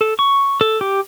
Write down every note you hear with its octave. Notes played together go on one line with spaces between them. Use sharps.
A4
C#6
A4
G4